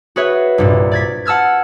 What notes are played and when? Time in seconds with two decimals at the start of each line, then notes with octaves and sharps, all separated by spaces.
0.16 F#4 G#4 B4 C#5 E5
0.58 C2 G2 A#2
0.91 D5 G#6 B6
1.25 F#5 A5 E6 F6 G#6